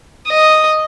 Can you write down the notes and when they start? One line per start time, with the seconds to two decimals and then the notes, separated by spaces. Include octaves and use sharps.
0.28 D#5